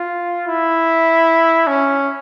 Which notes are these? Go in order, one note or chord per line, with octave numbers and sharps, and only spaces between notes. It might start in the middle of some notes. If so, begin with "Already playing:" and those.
Already playing: F4
E4
C#4